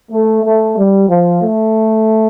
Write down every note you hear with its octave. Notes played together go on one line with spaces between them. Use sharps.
A3
A3
G3
F3
A3